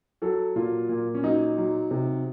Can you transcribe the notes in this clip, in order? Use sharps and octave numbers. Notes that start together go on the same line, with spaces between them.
F#3 A4
A#2 F4
A#2
C#4
F#3 D#4
F#3
C3